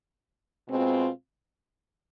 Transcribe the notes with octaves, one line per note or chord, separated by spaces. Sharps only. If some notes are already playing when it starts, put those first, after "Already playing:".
B2 G#3 C4 F4